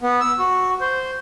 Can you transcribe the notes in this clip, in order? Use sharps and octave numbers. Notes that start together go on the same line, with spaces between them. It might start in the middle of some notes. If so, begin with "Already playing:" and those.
B3
E6
F#4
C5